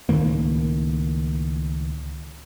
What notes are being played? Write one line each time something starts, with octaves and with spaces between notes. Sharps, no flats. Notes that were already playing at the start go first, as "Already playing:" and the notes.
C#2 A2 D#3 A#3